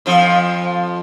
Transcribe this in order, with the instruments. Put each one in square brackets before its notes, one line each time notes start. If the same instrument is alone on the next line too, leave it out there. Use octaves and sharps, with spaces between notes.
[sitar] F2 F3